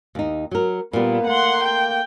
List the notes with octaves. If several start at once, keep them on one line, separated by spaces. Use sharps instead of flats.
D#2 D#4
F#3 A#4
A#2 G3 A#3 B3
A3 F#5 C6
G5